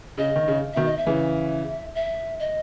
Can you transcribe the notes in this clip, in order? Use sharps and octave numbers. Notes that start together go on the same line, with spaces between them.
C#3 D#5
D#3
C#3
B2 D#3 E5
D#5
E5
C#3 E3
E5
D#5